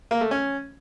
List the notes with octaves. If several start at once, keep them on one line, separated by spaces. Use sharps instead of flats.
A#3
A3
C#4